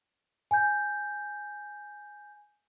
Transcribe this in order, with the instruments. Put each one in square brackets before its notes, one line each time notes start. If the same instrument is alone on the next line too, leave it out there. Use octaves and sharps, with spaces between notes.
[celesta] G#5 G6